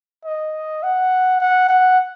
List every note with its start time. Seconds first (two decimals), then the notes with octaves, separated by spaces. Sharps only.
0.25 D#5
0.83 F#5
1.41 F#5
1.69 F#5